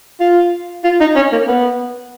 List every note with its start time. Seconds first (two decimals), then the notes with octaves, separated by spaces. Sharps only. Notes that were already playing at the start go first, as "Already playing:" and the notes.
0.20 F4
0.84 F4
1.00 D#4
1.16 C#4
1.32 A#3
1.48 B3